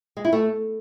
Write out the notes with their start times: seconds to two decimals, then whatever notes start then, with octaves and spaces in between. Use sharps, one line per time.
0.17 G#3
0.25 E4
0.33 A3